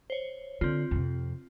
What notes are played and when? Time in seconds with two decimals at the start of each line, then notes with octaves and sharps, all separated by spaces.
0.10 C5 C#5
0.61 D3 C4 F4
0.91 F2 C3